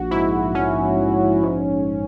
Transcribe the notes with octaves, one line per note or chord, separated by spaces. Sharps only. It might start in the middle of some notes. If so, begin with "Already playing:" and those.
Already playing: A#1 F#4
G#2 E4
A#1 C#4
A#1
G#2